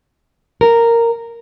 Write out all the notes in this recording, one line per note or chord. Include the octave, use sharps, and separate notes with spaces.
A#4